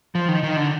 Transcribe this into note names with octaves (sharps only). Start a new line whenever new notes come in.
F3
D#3
D#3
D3